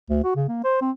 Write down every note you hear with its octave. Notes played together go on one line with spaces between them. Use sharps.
D2
F#4
C#3
A#3
C5
C4